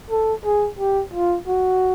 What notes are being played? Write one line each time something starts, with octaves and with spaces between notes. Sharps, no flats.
A4
G#4
G4
F4
F#4